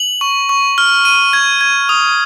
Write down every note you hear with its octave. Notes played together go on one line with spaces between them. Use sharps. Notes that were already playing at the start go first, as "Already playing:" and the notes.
Already playing: F#7
C#6
C#6
F6
D#7
G#6
G#6
D#6